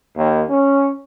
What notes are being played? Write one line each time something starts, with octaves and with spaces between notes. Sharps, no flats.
D#2
C#4